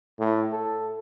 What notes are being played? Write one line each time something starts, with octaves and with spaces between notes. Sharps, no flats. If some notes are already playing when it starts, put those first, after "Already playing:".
A2
A4